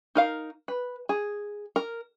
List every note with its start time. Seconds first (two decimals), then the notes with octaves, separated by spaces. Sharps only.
0.15 D#4 A#4 F5
0.68 B4
1.09 G#4
1.76 A#4